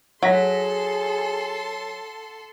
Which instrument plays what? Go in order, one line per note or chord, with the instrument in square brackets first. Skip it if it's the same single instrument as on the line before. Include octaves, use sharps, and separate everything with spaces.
[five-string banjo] F#3 [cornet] G#4 [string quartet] A4 C6 [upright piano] F#5 A#6 B6